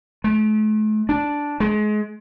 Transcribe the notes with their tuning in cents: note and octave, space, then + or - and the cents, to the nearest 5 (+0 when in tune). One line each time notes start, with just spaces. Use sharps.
A3 -40
D4 -5
G#3 +30